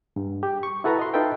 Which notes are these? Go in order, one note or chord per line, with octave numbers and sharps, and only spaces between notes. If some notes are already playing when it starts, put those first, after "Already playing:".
G2
G4
C#6
E4 F#4 A4 B4 A#5
D#5 C6
D#4 F4 A4 B4 E5 G5